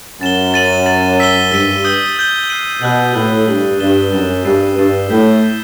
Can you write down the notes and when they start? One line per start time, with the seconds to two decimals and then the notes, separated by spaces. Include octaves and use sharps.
0.21 F#2 A6 E7 G7
0.54 A6 D#7 F#7
0.86 A6 D#7 F#7
1.19 E6 B6 D#7 G7
1.51 G2 E6 B6 D#7 G7
1.84 D#6 G6 D#7 G7
2.17 D#6 G6 D#7 G7
2.50 F#6 C7 D#7 F#7
2.82 B2 F#6 C7 D#7 F#7
3.15 A2 G6 B6 F#7
3.47 G2 G6 B6 F#7
3.80 G2 A6 E7 G7
4.12 F#2 A6 E7 G7
4.44 G2 E6 A6 C7 D#7
4.77 G2 E6 A6 C7 D#7
5.10 A2 G6 B6 E7 G7
5.43 G6 B6 E7 G7